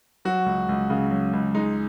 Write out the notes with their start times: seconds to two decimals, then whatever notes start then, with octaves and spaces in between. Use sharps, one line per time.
0.25 F#3 F#4
0.46 C#2
0.69 C#2
0.90 C#3
1.11 F#3
1.33 C#2
1.54 G#3 D#4